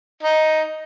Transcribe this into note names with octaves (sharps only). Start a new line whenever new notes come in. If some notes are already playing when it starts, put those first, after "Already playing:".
D#4